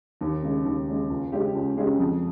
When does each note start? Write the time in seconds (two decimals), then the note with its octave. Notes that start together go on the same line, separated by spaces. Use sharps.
0.21 D#2
0.43 C#3 G#3
0.65 D#2
0.87 C#3 G#3
1.10 C#2
1.32 C#3 G#3 C#4 G4
1.54 C#2
1.76 C#3 G#3 C#4 G4
1.99 F2